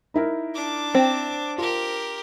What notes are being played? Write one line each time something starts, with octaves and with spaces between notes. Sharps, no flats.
D#4 E4 A#4
D4 D6
C4
F4 G4 A#4